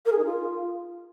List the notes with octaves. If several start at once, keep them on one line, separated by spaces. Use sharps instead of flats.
A#4
G#4
D#4
F4